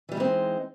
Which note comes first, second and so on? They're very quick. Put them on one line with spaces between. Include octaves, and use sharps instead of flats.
E3 G3 D#4 G#3 C4